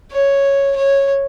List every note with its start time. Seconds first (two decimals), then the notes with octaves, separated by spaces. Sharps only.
0.12 C#5
0.76 C#5